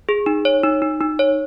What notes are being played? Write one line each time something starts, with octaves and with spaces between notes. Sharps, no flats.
G#4
D#4
C#5
D#4
D#4
D#4
C#5